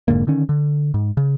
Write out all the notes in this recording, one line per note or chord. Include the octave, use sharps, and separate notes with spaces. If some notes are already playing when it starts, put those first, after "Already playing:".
F1 G#2 D3 A#3
D3 D#3 C#4
D3
G#2
C#3